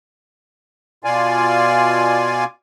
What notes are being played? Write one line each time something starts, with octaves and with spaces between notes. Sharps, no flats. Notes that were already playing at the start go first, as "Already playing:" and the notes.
B2 F4 D5 F5 G#5